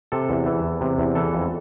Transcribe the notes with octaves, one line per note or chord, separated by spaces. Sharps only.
C3 A4
E2
E3
E2
C3
E2
E3 A4
F2